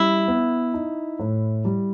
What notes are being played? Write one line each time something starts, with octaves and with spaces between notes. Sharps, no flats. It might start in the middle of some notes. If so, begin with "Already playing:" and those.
Already playing: G3 E4
B3
D#4
A2
G3